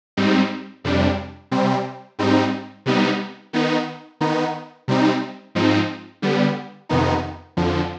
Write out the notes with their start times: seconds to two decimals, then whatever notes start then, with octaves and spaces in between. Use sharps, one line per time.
0.17 G#2 G3 C4 D#4
0.84 F2 C3 G3 D4
1.51 C3 G3 C4
2.19 G#2 G3 C4 D#4
2.86 C3 G3 B3 D#4
3.53 D#3 B3 D#4
4.21 D#3 B3 D#4
4.88 C3 G3 C4 D#4
5.55 G#2 F3 C4 D#4
6.22 D3 G3 B3
6.89 F2 C3 D#3 B3 D#4
7.57 F2 D3 F3